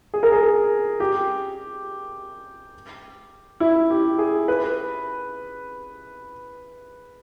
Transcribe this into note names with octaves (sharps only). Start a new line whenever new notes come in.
G#4
A#4
G#4
G4
E4
G4
G#4
B4